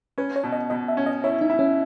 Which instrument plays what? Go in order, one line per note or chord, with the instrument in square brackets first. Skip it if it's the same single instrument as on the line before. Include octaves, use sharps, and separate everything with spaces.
[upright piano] C#4 [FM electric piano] B4
[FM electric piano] C#5
[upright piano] B2
[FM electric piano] D#5
[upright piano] B2 [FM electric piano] D#5
[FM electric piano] E5
[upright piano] C#4
[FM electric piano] D#5
[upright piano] E4 [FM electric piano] C#5
[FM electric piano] D#4
[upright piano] E4
[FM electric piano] C#4